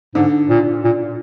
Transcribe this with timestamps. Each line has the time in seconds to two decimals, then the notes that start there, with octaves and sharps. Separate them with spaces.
0.15 G#2 D3
0.50 A#2
0.84 A#2